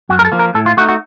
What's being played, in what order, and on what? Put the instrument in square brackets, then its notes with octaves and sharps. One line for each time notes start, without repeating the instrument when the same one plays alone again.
[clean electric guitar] F#2 F#4
A#4
A4
F3 A#3
A#4
A2 A4
F4
A3 F#4
D#4
F#4